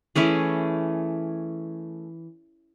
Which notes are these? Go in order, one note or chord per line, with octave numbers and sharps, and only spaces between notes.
E3 A3 C#4 G#4